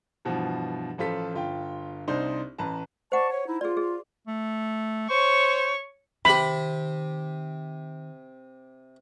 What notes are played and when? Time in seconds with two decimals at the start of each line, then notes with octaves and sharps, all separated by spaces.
0.25 G2 B2 E3 F3
0.98 A1 F3 F4 A4 B6
1.34 G1 F4 G5
2.08 C2 D4 D#4 C5 C6
2.58 A1 B4 A5 A#5
3.12 C5 D5 F#5 A5 C#6
3.30 C#5
3.47 D#4 E4
3.61 F4 G#4 D5
3.77 G#4
4.27 A3
5.10 C5 C#5 C#6
6.25 C3 D#3 G4 B5